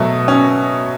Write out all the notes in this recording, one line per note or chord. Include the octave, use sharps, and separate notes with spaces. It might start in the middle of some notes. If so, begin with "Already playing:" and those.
Already playing: B2 F#3 A3
C#4